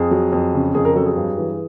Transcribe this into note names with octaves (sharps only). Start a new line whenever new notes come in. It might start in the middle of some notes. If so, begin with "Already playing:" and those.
Already playing: F2 G#4
F#3
F2
C#3
F2 G#4
A#4
F#3 A4
G#4
G2
E3